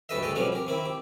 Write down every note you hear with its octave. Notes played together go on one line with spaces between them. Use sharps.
D2 G2 A4 B4 D#5 E5
D2 G#3 A4 D#5 G5
B2 F3 G3 G#3 C4 C#4
G4 A#4
D#3 C4 E4
G4